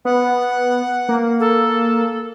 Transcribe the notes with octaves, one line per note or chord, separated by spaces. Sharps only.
B3 F#5
A#3
A4